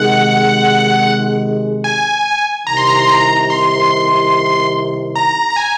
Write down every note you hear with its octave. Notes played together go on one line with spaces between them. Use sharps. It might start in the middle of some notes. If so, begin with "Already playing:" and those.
Already playing: C3 D#3 G#3 F#5
G#5
C2 C3 D#3 A#5
C6
A#5
C6
A#5
C6
A#5
A#5
G#5